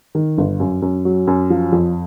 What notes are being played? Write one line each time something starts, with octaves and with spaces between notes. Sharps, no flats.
D#3
G1
F#2
F#2
F#3
F#2
F3
F2